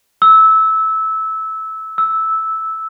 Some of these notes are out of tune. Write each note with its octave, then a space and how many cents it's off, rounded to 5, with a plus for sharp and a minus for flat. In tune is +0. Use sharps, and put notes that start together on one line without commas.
E6 -20
E6 -10